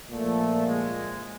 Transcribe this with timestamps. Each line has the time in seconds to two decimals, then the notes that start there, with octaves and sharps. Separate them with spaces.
0.12 A#2 A3
0.17 F3
0.65 G#3